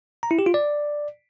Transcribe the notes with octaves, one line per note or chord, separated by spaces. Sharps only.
A#5
E4
G4
F4
D5